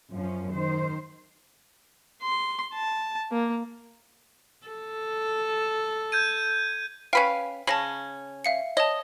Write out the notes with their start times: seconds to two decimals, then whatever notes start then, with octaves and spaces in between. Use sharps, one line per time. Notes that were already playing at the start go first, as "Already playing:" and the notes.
0.13 F#2 F3 C#4
0.52 D#3 C5
2.22 C6
2.74 A5
3.31 A#3
4.67 A4
6.12 G6 G#6 D#7
7.13 C#4 B4 F5 G5
7.67 C#3 C#4 A5 A#6 F#7
8.44 E5 F5 C#7
8.77 C#5 D#5 A5